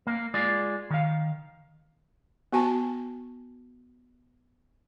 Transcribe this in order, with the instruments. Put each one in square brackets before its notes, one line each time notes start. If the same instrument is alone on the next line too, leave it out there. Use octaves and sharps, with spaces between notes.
[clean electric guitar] A#3
G#3 F4 D5
D#3 F5
[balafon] B3 F#4 G#5 A5